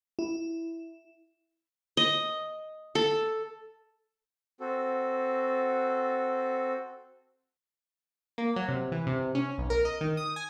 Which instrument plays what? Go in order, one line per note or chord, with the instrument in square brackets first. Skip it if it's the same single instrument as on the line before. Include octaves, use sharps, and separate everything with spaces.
[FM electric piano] E4
[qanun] D#5
A4
[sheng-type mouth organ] C4 F#4 A4
[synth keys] A#3
F#3
C3
E3
C3
C#4
B1
A#4
D#5
D#3
D#6
G#5